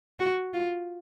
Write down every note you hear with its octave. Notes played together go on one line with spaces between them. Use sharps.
F#4
F4